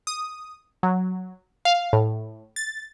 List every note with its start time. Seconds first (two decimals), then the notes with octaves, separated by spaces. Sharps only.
0.07 D#6
0.83 F#3
1.65 F5
1.93 A2
2.56 A6